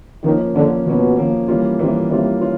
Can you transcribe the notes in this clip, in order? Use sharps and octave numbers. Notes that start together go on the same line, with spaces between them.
D#3 F3 A#3 C#4
D3 F3 A#3 C#4
B2 F3 A#3 C#4
F3 A#3 C#4
E3 G3 A#3 C#4 F4
C3 E3 G3 A#3 C#4 F4
C3 E3 G3 A#3 C#4 F4
C#4 F4